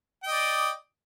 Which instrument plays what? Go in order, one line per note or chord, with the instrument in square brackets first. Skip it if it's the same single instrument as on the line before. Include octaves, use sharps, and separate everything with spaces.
[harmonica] G5
D#5
D5